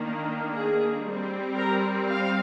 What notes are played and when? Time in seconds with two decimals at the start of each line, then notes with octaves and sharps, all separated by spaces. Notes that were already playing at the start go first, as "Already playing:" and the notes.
Already playing: D#3 A#3 D4
0.53 G#4
1.04 G3 C4
1.56 A#4
2.07 F5